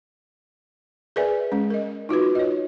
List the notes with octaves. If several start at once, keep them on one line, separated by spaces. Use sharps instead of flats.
G#4 A#4 B4 D5 E5 G#5
G#3 C#4
A#4 D#5
D#4 F4 F#4 B4
C#5 D#5